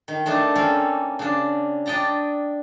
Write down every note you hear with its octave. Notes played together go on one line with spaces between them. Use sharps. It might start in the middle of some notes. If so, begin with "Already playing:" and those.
D#3
A3 D4 D#4
A#3 C4 C#4 A4 A#4
C#3 D4
D4 D#5 G5 A5 A#5